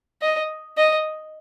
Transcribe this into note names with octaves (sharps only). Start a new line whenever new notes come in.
D#5
D#5